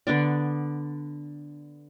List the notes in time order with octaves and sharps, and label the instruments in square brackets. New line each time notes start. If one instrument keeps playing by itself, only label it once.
[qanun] D3 B3 D4 D5